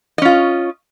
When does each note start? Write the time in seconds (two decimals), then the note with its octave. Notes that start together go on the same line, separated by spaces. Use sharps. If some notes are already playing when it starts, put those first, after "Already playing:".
0.18 D#5
0.22 C#4
0.25 F4